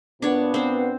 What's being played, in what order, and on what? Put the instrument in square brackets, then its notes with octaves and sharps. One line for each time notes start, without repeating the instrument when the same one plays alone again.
[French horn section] A#2 B3 [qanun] D4 C#5
[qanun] C4 C5